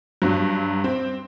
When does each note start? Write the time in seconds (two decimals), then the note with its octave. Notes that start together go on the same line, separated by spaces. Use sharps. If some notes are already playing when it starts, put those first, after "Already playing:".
0.22 G2 F#3
0.84 C4